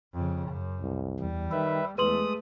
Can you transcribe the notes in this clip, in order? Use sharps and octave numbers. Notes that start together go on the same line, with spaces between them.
F2 C#3
F#2
C2
E2 G3
D#3 B4 E5
E2 G#3 A3 B4 C6 D#6 F#7